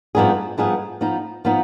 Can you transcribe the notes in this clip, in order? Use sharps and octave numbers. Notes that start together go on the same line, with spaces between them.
G2 F3 B3 D#4 G#4
G2 F3 B3 D#4 G#4
F3 B3 D#4
F3 B3 D#4